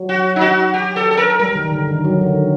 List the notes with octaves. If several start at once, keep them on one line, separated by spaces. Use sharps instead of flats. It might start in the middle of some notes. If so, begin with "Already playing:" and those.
Already playing: F#3
F#4
D#4
F#4
G4
A4
A4
A#4
G3 A#4
D#3
D3
D#3
F#3
D3
D#3